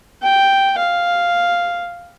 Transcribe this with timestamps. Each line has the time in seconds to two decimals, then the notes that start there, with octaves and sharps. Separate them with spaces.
0.22 G5
0.78 F5